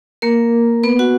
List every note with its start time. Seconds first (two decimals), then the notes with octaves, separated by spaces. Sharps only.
0.22 A#3 A#4
0.83 B3 B4
0.99 F#4 F#5